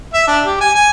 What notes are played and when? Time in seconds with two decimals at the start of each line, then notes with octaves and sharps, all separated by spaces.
0.13 E5
0.27 D4
0.45 G4
0.61 G#5
0.75 G#5